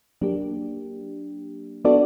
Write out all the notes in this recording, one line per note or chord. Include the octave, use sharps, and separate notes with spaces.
F#3 A#3 D4 G4
B3 D4 F#4 A4 D5